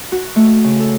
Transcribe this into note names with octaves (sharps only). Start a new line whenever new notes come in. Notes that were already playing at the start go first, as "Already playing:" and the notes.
F#4
A3
C#3
A4